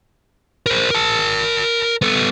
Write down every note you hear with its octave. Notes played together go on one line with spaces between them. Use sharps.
A#4 C5
A#4 A5
B3 A4